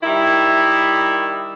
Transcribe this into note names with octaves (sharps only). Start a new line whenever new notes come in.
D#3 G3 E4